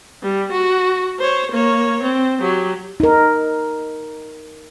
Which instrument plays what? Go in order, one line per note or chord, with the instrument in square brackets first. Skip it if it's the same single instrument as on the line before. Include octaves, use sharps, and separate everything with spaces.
[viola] G3
F#4
C5 C#5
A#3 C#5
C4
F#3 G4
[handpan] D#4 A#4